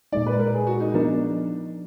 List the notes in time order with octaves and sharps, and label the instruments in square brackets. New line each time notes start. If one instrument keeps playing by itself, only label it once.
[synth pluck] A#2 G#3 D#4 [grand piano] D5
[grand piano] B4
A#4
G#4
F#4
D#4
[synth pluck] F3 B3 D#4 A#4 [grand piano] D4